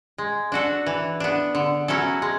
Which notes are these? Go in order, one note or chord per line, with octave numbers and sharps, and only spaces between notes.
G#3
D4 F#4 A4
E3
B3 D4
D3
F#3 C#4 E4 A4
G#3